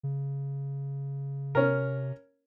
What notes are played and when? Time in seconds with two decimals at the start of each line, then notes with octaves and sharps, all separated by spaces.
0.03 C#3
1.55 C3 C#4 A#4